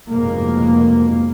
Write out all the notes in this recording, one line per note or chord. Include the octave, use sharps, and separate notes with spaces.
F1 F2 G#2 B2 A#3